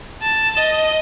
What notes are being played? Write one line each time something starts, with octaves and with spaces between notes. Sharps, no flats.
A5
D#5